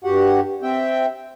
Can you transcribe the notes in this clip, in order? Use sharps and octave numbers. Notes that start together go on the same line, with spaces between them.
G2 F#4 G4 F#5
C4 E5 G5